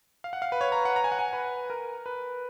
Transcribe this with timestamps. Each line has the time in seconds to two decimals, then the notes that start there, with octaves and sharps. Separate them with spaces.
0.24 F5
0.33 F#5
0.42 F5
0.52 B4
0.61 C#5
0.72 A#5
0.85 F#5
0.96 A#5
1.04 G#5
1.12 F#5
1.19 G#5
1.33 B4
1.70 A#4
2.06 B4